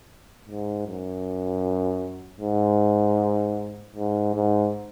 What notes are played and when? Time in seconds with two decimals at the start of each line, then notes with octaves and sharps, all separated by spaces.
0.49 G#2
0.87 F#2
2.41 G#2
3.95 G#2
4.35 G#2